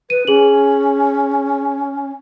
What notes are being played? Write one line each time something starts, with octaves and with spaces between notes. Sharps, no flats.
B4 D#7
C#4 G#4 F#7